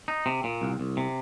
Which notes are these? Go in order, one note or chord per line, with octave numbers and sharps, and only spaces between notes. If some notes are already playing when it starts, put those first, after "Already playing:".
D#4
C3
A#2
C2
C2
C3